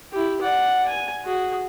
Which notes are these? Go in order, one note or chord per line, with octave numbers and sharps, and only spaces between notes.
E4 G4
D5 F#5
G#5
F#4 G#4